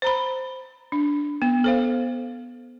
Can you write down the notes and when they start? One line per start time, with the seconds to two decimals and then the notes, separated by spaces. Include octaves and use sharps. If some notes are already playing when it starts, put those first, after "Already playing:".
0.02 C5 A#5 B5
0.92 D4
1.42 B3
1.64 A4 C5 F5